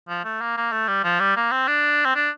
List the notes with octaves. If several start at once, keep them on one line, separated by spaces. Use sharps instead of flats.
F3
A3
A#3
A#3
A3
G3
F3
G3
A#3
C4
D4
C4
D4